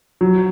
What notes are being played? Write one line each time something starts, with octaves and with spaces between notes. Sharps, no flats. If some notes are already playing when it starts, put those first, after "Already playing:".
F#3